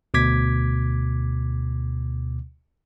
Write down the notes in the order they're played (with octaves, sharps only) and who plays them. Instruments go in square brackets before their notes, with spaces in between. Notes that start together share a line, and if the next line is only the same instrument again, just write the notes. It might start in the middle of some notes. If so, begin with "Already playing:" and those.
[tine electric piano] D2 B2 D6 G#6 B6